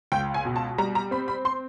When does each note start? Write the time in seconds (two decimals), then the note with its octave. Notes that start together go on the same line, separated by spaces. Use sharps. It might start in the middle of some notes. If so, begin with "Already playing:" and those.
0.12 C#2 G5
0.34 G#5
0.45 B2
0.56 A5
0.78 G3 A#5
0.95 A#5
1.11 C4 B5
1.28 B5
1.45 C6